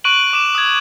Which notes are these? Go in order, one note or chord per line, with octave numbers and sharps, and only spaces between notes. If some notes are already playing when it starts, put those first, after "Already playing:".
C#6 F#6 D7 D#7 F#7
D6 E7
D#6 G#6